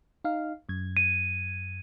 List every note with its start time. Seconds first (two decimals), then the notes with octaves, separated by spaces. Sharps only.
0.24 D#4 F5
0.69 F#2 G#6
0.97 D#7